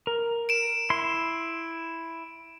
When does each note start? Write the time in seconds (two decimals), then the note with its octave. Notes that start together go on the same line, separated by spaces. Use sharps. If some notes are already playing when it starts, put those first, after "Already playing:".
0.07 A#4
0.49 D7 E7
0.90 E4 C6